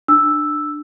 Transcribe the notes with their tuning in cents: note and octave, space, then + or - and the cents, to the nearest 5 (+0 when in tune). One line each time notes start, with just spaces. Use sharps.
D4 +20 E6 +0